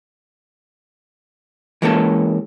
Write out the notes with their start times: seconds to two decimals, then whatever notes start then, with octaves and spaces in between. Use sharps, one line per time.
1.82 E3 G#3 A#3 C#4 G4 A4